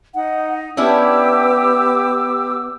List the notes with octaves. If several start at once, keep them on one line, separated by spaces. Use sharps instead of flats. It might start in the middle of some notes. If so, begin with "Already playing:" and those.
D#4 F#5
B3 C#4 D4 E4 G4 D6 E6